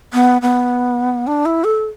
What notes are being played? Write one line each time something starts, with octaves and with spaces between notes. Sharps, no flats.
B3
B3
D4
E4
A4